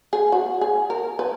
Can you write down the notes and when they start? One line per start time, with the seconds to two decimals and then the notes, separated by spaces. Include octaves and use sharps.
0.13 G#4
0.32 F#4
0.61 G#4
0.90 A#4
1.19 B4